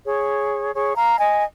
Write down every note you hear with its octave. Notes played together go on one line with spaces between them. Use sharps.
G#4 C#5
G#4 C#5
F5 A#5
D#5 G#5